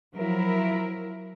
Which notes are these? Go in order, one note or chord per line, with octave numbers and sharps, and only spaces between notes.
F3 F#3 E4 A#4